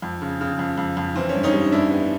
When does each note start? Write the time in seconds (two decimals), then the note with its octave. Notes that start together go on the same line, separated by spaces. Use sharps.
0.02 F2
0.22 C#3
0.41 C#3
0.59 F2
0.77 F2
0.97 F2
1.15 E3 C4
1.29 C#4
1.34 G2
1.43 C#4 D#4
1.53 G3
1.72 G3 D4 E4
1.91 B3